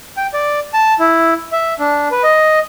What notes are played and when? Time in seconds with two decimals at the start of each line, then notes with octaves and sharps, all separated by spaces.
0.17 G5
0.34 D5
0.74 A5
0.99 E4
1.52 E5
1.79 D4
2.11 B4
2.23 D#5